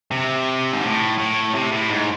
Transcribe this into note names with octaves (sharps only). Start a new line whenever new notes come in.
C3
G#2
A2
A2
C3
A2
G#2